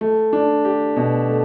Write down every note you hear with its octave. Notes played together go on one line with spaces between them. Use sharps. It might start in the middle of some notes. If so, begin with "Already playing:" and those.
A3
D4
G4
B2
A3